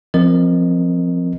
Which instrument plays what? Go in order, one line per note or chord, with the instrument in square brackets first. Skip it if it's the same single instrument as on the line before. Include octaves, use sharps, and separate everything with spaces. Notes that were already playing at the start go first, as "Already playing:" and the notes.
[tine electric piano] F3 C4 A#4 D#5